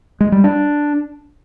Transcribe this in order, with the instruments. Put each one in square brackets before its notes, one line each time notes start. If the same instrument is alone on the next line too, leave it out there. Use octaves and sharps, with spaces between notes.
[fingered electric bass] G#3
G3
D4